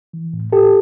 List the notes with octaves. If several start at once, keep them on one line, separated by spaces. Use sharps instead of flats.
E3
A2
A2 G4 A4